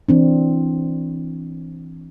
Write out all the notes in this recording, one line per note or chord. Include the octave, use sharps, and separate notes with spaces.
E3 C4 D4